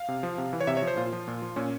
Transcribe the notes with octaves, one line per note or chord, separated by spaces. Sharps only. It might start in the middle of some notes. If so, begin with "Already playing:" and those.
Already playing: F5
C3
F3
C3
E3
C#5
C3 E5
C#5
F3
C5
A#2 F4
F3
A#2
F3
A#2 C#4